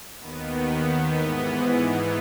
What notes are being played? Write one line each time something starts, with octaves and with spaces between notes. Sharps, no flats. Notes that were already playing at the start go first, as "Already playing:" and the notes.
D#2 D#3 B3
G#2 E3 B3
B3